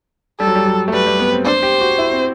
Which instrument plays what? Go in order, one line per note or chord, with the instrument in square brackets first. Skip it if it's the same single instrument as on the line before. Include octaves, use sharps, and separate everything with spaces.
[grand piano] G3 [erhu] A4
[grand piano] F#3
G3
F#3
A3
[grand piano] G3 [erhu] B4
[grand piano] G3
B3
C4
[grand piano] D4 [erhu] C5
[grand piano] G4
F#4
E4
C4